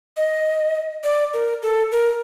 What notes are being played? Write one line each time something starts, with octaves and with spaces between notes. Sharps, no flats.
D#5
D5
A#4
A4
A#4